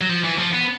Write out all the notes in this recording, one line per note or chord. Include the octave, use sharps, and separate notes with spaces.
F#3
F3
E3
F3
B3